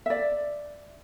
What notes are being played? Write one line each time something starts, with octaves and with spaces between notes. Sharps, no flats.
D5 E5